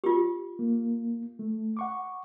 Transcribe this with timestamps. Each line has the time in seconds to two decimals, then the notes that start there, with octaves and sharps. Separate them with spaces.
0.04 F4 G4
0.59 A#3
1.39 A3
1.77 F#5 C#6 D6